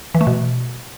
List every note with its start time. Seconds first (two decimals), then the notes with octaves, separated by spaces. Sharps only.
0.15 E3
0.21 A3
0.27 B2